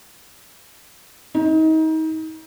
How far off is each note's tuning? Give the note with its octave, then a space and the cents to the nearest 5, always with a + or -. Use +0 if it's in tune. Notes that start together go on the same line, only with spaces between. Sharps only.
D#4 +30